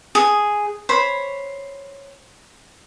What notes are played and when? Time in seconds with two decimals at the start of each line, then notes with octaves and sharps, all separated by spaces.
0.15 G#4
0.89 C5 C#5 B5